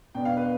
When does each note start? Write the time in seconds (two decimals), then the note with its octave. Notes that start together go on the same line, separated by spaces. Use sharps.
0.15 B2 B3 D4 G5
0.25 F5
0.37 B4